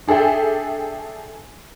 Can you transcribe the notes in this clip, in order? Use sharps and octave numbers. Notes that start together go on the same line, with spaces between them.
D4 G#4 A4 E5 G5